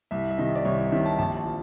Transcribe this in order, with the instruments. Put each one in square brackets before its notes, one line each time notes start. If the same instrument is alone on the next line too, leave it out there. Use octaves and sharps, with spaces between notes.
[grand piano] C2 E5
E5
C3 D#3 D#5
D5
C2 C#5
C#5
C3 D#3 E5
A5
A#1 A5
A5
F3